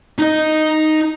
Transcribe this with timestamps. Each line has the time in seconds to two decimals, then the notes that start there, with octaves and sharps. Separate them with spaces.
0.19 D#4 D#5